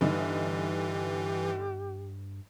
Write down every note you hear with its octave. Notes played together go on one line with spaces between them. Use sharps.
G1 G2 D3 E3 D#4 G4